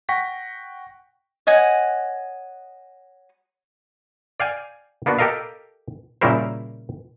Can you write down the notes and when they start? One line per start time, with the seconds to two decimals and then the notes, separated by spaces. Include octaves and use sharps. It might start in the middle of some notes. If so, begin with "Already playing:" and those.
0.09 F#5 G5 C#6 A#6 B6
1.47 C#5 D#5 F#5 G#5
4.40 D5 F5 G5 G#5
5.06 A#3 B3 D4 F#4
5.18 G4 A4 A#4 D#5 F5
6.21 A#2 C#3 G3 E4 A#4 C5